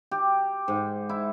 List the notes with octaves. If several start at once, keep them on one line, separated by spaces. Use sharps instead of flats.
G4
G#2
E4